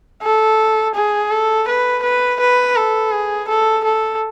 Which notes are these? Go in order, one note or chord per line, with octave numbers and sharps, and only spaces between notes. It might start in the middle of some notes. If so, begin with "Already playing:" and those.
A4
G#4
A4
B4
B4
B4
A4
G#4
A4
A4